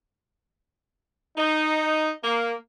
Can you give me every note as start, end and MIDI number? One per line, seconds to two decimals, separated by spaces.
1.37 2.11 63
2.23 2.53 58